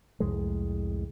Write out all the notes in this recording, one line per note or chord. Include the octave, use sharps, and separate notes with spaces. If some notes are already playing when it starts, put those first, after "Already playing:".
C2 F2 A2 G#3